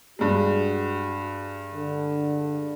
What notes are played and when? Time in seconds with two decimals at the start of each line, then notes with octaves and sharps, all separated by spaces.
0.19 G2 G#3 F#4
1.74 D3